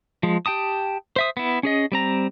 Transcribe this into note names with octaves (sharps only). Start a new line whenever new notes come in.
F3 G#3
G4 G5 A5 D#6
C5 E5 D#6
B3 E4
C#4 G#4 D#5
G3 C4 A#5